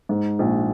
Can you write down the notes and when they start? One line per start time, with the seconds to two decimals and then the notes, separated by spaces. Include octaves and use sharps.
0.09 G#2
0.39 A#1